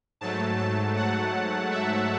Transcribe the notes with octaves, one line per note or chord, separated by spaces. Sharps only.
G#2 F#3 A3 A5
A5
F#5
E5